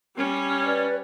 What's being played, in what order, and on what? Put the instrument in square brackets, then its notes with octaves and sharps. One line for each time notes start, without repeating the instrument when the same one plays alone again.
[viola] G3 C#4
[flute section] B4 D5